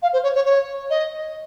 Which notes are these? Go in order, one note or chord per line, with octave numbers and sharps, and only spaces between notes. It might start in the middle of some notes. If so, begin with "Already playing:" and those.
F5
C5
C#5
C#5
C#5
D#5